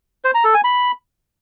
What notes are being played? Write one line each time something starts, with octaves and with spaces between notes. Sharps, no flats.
C5
A#5
A4
G#5
B5